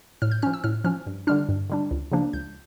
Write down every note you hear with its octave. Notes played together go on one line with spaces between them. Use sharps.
A2 F6
G6
F3 C#4 F6
E6
A2 F6
F3 C#4 F6
G2
D3 G3 D4 F6
G2
D3 G3 D4
C#2
C#3 F3 A#3 D4
C#2 G6